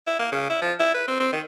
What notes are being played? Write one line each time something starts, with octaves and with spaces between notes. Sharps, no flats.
E4
A#3
C#3
E4
F3
E4
B4
C4
C4
D#3